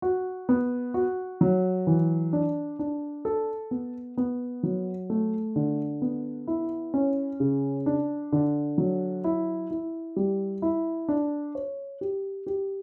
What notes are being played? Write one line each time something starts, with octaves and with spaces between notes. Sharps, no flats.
F#4
B3
F#4
F#3
E3
D4
D4
A4
B3
B3
F#3
A3
D3
B3
E4
C#4
C#3
D4
D3
F#3
E4
E4
G3
E4
D4
C#5
G4
G4